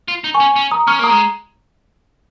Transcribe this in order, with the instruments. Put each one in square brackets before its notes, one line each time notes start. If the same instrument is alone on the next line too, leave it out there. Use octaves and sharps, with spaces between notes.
[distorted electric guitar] F4
D#4
[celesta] G#5 C#6
[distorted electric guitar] C#4
C#4
[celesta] A#5 D#6
[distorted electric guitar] C#4 [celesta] C#6 F6
[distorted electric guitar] A#3 [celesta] A#5 D#6
[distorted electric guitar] G#3